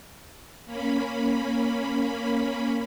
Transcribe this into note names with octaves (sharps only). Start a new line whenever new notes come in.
A#3 C#4 B5